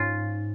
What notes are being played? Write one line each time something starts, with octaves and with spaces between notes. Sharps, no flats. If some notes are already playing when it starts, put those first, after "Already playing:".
Already playing: G#2 C#4 F4